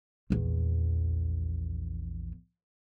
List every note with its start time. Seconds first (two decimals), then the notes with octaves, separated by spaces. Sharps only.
0.30 A#1 E2